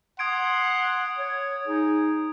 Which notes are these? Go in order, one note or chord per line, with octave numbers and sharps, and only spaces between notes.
F#5 C6 D#6 G#6 D7
C#5
D#4 G#4